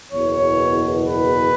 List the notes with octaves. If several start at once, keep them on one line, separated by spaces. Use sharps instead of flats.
F#1 E2 B2 C#5
B4